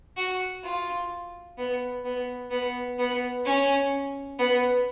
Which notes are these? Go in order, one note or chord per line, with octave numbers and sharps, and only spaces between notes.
F#4
F4
B3
B3
B3
B3
C#4
B3